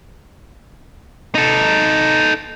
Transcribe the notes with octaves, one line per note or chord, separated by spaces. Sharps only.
D#4 A4